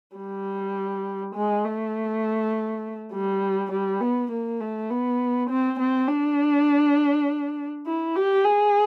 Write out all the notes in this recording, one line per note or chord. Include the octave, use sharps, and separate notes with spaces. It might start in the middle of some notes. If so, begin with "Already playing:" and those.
G3
G#3
A3
G3
G3
B3
A#3
A3
B3
C4
C4
D4
E4
G4
G#4